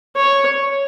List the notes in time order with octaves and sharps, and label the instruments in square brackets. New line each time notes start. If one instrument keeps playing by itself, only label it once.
[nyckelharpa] C#5